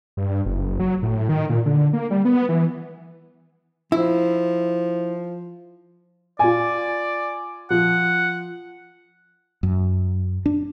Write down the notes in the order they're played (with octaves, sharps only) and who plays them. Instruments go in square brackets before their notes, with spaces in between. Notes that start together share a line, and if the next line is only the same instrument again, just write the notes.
[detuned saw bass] G2
F#1
F#3
A2
D#3
A#2
D3
A#3
G3
B3
E3
[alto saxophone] F3 [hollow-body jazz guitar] E4
[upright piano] F4 G#5 [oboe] D5
[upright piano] F3 [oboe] F#5
[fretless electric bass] F#2
D4